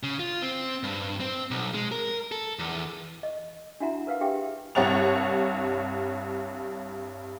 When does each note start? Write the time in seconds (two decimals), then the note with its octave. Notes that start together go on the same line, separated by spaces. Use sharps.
0.03 C#3
0.19 F4
0.42 C4
0.83 G2
1.20 C4
1.51 B1
1.75 G#3
1.92 A#4
2.32 A4
2.59 E2
3.23 D#5
3.80 D4 E4 F#4 E5 F#5 A#5
4.07 A#4 B4 F5 F#5
4.21 D4 G4 G#4 E5 G5
4.75 C2 G2 C#5 F#5 A6 F7